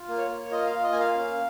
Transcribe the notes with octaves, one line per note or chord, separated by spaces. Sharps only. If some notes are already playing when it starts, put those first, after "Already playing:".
Already playing: F4
A#3
C#5
A#3
F4 D#5
F5
F4
D#5
A#3 G#5
F5
C#4